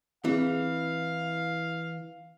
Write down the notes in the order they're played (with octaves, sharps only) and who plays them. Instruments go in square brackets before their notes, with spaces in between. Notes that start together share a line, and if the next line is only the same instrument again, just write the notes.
[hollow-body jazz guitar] E3 [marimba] C4 G#4 [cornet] F5